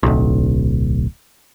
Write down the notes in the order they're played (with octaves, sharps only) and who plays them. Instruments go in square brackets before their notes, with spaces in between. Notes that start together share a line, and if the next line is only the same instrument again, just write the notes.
[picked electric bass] D1 B1